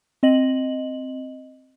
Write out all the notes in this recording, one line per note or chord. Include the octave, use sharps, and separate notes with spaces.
C4 D#5 F#7